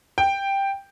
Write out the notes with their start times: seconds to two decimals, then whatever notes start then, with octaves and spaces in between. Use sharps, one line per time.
0.18 G5